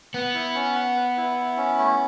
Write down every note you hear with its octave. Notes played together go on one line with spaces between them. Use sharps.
B3 B4
E4
C#4
F#5
B4
E4
E4
C#4
A3